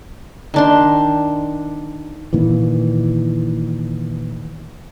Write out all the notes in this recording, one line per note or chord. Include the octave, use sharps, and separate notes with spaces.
D#3 D4 C6
A#2 D#3 E3